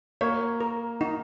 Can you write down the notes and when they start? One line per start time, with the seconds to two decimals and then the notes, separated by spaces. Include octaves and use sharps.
0.21 A#3 C#5
0.60 A#4
1.01 D#4